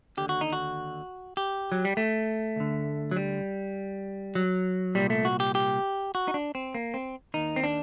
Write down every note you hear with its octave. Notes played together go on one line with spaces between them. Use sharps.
D#2 D3 G4
F#4
D#4
F#4
G4
F#3
G3
A3
D2 D3
F#3
G3
F#3
C2 A#2 G3
A3
F#4
G4
G4
F#4
D#4
D4
C4
A#3
C4
D#2 D#3 D#4
C4
D4